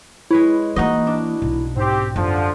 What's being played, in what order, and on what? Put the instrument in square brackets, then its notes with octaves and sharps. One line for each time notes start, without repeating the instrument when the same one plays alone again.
[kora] G#3 B4 C#5 [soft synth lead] E4
[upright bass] E3 A#3 [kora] D#4 F#4 D#5
[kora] D4
[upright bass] B1
[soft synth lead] G#2 [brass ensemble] C4 G4
[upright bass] F#2 [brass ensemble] D3 F3